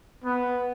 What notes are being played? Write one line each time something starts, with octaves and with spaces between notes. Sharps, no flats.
B3